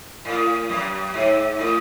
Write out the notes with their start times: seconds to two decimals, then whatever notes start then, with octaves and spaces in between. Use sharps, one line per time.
0.25 A2
0.69 F#2
1.14 G#2
1.59 A2